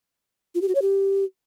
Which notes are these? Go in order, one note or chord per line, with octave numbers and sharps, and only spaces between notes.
F4
G4
F#4
C#5
G4